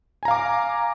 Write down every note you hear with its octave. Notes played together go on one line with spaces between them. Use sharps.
F5 G#5 A#5 D6